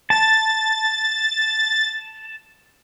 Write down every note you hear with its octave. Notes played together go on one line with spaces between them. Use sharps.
A5 A6